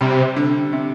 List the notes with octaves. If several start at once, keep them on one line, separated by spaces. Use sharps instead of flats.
C3 G3
D3
C3